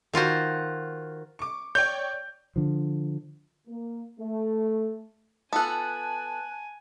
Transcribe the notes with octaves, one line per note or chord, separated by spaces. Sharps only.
D#3 F4 F#4 C5
C#6 D6
C#5 D5 G5 G6
D3 F3
A#3
A3
B3 F4 A4 G#5 A5 F#6